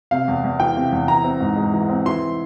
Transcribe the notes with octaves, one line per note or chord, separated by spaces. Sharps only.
C3 F5
E2
E2
E3 G5
C3
E2
E3 A#5
C4
G#2
G#3
E3
C4
E3 C6